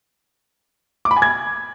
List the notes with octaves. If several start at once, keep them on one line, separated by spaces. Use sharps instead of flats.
D6
B5
G#5
G#6